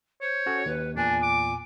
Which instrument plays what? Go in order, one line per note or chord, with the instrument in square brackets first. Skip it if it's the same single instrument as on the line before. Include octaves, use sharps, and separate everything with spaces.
[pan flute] C5 [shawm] C#5
[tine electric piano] C#4 F#4 A4
[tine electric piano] D#2 [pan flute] B4
[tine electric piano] E2 A#2 [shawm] D4 [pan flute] G#5
[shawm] D6